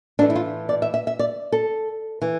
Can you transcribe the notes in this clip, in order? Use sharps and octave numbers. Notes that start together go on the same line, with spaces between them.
A2 E3 A3 D4
E4
F4
D5
E5
E5
E5
D5
A4
E3